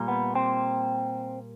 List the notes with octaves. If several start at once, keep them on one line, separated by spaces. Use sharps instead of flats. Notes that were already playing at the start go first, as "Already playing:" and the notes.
Already playing: A#2 G3 A#3
B3
C4